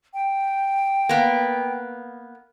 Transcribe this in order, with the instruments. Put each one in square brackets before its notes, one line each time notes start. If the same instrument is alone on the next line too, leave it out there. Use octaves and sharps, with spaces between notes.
[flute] G5
[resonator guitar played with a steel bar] A#3 B3